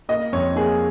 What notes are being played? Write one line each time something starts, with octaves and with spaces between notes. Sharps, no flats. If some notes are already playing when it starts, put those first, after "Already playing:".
A#3 D#5
F2 C#5
A#3 G#4